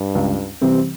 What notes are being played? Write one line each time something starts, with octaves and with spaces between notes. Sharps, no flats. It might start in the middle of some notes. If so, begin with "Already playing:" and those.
Already playing: G2
C#2
C3 E3 G3 C4